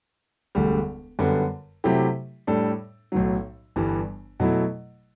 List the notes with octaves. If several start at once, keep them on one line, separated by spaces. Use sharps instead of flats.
E1 D2 D3 G3
F#2 D3 G3 B3
C3 F#3 A3 E4 G4
A2 G3 D4 A4
B1 A2 F#3
G1 G2 E3 G3
B2 F#3 A3 E4